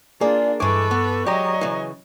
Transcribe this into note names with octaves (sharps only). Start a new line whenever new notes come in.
A#3 D4 F4 G#4 D5
G2 E3 G#3 A4 B4 C#6 D6
B3
F#3 G#3 G4 D5 D#5 A#5
C#3 E3